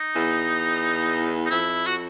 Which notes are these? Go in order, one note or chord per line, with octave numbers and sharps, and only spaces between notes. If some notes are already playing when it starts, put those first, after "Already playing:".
Already playing: D#4
E2
D#4
F2 E4
F#4